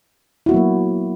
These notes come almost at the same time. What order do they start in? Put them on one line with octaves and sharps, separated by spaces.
E4 F#4 B3 F#3 A#3